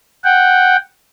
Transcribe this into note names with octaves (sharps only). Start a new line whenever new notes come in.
F#5 G5